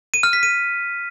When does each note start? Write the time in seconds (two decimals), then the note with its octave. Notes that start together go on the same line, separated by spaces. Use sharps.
0.14 D#7
0.23 F6
0.33 B6
0.43 D#7